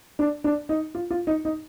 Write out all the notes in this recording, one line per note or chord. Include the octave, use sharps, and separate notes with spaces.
D4
D4
D#4
F4
F4
D#4
D#4